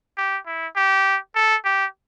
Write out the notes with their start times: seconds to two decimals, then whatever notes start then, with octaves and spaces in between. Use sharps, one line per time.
0.17 G4
0.46 E4
0.76 G4
1.35 A4
1.65 G4